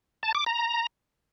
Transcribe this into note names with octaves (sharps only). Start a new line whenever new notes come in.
A5
D6
A#5